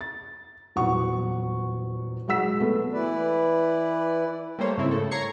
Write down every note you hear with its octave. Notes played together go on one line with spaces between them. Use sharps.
A6
D#1 E2 F#3 F#5 C#6
F#3 G#3 F#5 E6 B6
A3 B3
E3 E4 B4 D5
G3 A3 A#3 A4 C5 C#5
G#2 C#3 C4 E4
C#3 A3 A4
C#5 A#5 C#6 G#6 C7 C#7